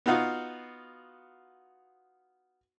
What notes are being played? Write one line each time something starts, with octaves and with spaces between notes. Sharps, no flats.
B3 D#4 F4 F#4 F5